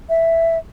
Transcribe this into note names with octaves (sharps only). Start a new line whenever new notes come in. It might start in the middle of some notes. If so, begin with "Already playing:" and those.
E5